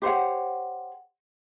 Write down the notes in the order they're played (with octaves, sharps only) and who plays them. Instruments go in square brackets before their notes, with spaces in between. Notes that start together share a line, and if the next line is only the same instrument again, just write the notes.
[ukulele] G4 C5 C#5 F#5